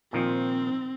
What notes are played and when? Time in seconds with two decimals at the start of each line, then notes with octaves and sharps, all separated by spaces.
0.13 A#2 D#3 F3 C4